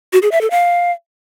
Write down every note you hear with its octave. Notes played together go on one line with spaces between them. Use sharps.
F#4
G#4
E5
A4
F5